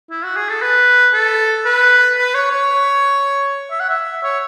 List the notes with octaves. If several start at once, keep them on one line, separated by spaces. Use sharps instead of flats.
E4
F#4
G#4
A4
B4
A4
B4
B4
C#5
C#5
E5
F#5
E5
C#5